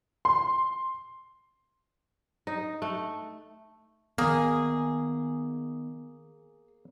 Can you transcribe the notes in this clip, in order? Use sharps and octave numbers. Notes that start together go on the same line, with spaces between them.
C6
D#4
A3
D#3 A#3 B3 G#4